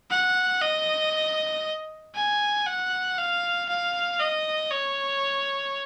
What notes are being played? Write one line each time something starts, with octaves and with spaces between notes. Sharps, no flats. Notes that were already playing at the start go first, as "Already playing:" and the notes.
F#5
D#5
G#5
F#5
F5
F5
D#5
C#5